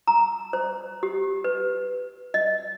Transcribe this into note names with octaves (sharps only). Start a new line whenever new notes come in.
A#5
C5
G4
B4
D#5